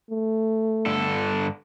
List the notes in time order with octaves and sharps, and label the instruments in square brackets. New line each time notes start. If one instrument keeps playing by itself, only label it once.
[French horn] A3
[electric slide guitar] G2 D3 A4